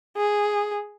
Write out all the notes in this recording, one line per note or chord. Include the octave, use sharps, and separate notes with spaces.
G#4